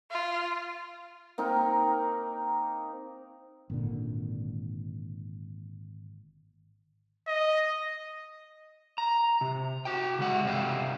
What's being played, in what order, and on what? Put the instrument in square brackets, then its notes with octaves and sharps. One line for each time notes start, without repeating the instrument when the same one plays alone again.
[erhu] F4
[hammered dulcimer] A#3 C4 D#4 A#4
[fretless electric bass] G#1 A#2 D3
[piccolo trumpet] D#5
[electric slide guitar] A#5
C3
F#4 G5
C#3 G#3 F#5
G2 C3 C4 G4 F5 G5